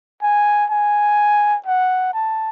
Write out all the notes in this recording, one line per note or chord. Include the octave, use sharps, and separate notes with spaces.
G#5
G#5
F#5
A5